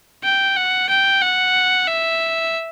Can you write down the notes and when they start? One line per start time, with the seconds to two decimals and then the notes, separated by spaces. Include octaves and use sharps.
0.24 G5
0.56 F#5
0.89 G5
1.21 F#5
1.87 E5